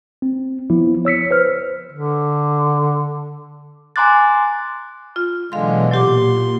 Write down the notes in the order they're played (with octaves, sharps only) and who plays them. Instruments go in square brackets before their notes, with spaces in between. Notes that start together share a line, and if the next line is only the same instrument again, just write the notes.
[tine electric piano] C4
F3 B3 E4
C#5 E6 B6 C#7
B4 C5 F6
[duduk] D3
[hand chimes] G#5 A#5 C6 D6 F#6 A6
[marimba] F4
[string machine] B2 E3 F#3 [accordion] D3 G#3 [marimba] F5 C6
[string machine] A#2 [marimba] F#3 G4 D6 [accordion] C6